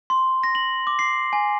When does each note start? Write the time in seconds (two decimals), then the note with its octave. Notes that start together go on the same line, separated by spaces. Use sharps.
0.10 C6
0.43 A#6
0.55 F#7
0.87 D6
0.99 C7
1.33 G#5